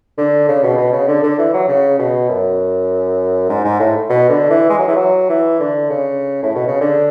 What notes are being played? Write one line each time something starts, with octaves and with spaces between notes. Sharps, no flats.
D3
C#3
B2
B2
C#3
D3
D3
E3
F#3
C#3
B2
F#2
G#2
G#2
A2
B2
D3
E3
G#3
F#3
E3
F#3
E3
D3
C#3
A2
B2
C#3
D3